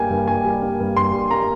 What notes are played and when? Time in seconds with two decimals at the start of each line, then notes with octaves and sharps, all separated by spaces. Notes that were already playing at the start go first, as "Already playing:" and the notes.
Already playing: G2 G3 A#3 G5 G#5
0.10 G2
0.28 G2 G#5
0.45 G3
0.62 A#3
0.80 G2
0.97 G2 C6
1.13 G3
1.31 A#3 A#5